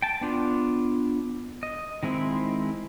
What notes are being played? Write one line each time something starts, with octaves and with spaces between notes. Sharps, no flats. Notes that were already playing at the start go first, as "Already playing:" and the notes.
G5 A5
B3 D4 F4
D#5
D#3 G#3 C4 E4